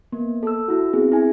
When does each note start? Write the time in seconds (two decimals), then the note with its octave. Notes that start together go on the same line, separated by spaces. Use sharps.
0.12 A#3 B3
0.43 A4 E6
0.68 E4 F#4
0.93 B3 C4 G#4
1.12 E4 G#5